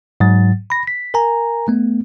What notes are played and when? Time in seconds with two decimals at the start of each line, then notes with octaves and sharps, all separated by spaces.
0.20 G#2 F#3 A6
0.70 B5 A#6
0.87 B6
1.14 A#4 G#5 A#5
1.68 A3 B3